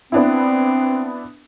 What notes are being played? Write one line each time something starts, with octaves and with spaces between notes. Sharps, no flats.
B3 C4 D4 E4